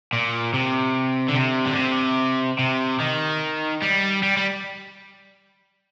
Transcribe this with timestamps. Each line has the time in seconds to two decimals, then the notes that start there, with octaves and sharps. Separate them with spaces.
0.13 A#2
0.54 C3
1.29 D3
1.36 C3
1.66 D3
1.76 C3
2.59 C3
3.00 D#3
3.82 G3
4.23 G3
4.37 G3